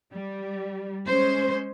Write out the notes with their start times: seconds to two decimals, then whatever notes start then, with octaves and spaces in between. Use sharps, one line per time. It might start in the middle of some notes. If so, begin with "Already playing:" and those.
0.12 G3
1.06 G#3 C#4 C5